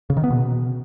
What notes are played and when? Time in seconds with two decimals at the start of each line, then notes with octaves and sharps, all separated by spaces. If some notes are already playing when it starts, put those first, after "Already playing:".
0.10 C#3
0.17 D#3
0.24 B3
0.30 B2